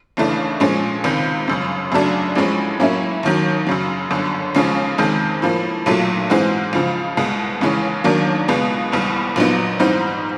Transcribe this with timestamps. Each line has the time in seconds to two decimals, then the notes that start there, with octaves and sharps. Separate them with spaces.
0.17 D#2 C#3 E3 A3 D4
0.60 A#2 F3 G#3 C#4
1.04 C#2 C3 D#3
1.48 G1 F#2 C#3
1.92 F#2 C#3 F#3 A3 D4
2.35 A1 A2 F3 G#3 C#4
2.80 A2 F#3 A#3 C#4 E4
3.23 D#2 D#3 F#3
3.67 F#2 C#3 F#3
4.11 G1 F#2 D3
4.55 D#2 C#3 F3 G#3 C#4
4.98 F2 C3 D#3 G#3
5.42 A2 F3 A#3
5.86 B1 A#2 F#3 A3
6.30 G#2 E3 G#3 C4
6.73 C#2 C#3 F3
7.17 C2 B2 G#3
7.61 D#2 C#3 E3 G#3 C#4
8.04 D#2 D#3 F#3 A#3 D4
8.48 C#2 B2 G#3 B3
8.92 F#1 E2 B2 G3
9.36 A#1 A#2 F#3 B3 D#4
9.79 G#2 E3 G3 C4 D#4